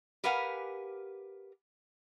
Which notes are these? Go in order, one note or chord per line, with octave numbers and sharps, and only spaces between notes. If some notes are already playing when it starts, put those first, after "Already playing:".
G4 A#4 B4 F5 F#5 G#5